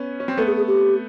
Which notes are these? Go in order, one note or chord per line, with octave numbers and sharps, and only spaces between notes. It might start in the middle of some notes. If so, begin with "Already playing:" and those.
Already playing: B3 C#4
C#4
C4
A3 B3 A4
G#4
G#4
G4